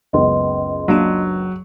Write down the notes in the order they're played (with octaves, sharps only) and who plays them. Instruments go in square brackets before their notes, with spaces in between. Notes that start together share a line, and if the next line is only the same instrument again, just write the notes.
[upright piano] F#1 C#2 B3 [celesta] D#5 C6
[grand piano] F#3 [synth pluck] A#3 D4 D#7